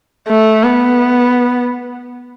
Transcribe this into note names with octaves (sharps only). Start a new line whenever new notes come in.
A3
B3